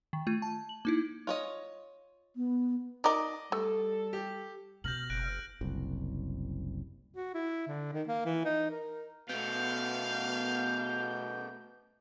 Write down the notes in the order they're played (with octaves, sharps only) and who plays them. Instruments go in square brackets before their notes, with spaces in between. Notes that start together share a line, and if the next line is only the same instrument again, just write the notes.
[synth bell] D#3
A3 F4 G#6 D#7
A5
F#7
A#3 D#4 E4
[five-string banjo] F4 C#5 D#5
[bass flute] B3
[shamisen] D#4 A#4 [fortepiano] D5 D#5 D6
[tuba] G3 [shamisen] A3 [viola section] A4
[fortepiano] G4
[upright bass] B2 [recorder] F6 [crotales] G6 A#6 F#7
[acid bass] F#1 [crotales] F#6 A#6 D7
[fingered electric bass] F#1 C2
[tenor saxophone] F#4
E4
D3
D#3
A#3
E3
D#4
A#4
[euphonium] B2 [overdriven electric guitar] A3 B3 [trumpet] F5 [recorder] G6